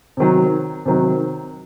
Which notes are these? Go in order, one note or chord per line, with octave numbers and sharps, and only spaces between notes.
C3 D#3 F#3
C3 D#3 F#3